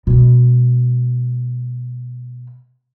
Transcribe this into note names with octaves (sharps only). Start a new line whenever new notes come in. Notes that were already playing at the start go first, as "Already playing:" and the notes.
B2 G#3